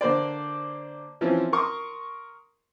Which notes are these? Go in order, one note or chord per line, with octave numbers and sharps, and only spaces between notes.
D3 A#3 C5 D5
E3 F3 C4 C#4
A#4 C6 C#6 D#6